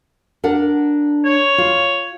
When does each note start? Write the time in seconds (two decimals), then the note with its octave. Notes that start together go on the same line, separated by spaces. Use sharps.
0.44 D4 A#4 F#5
1.25 C#5
1.58 F4